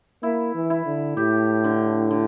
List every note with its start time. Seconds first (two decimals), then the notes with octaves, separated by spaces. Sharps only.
0.23 A#3 E4
0.55 E3
0.70 E4
0.86 D3
1.17 A2 G4
1.64 D3
2.11 D3